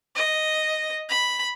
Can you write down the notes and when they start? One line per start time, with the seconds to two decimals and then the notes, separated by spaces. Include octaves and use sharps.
0.16 D#5
1.09 B5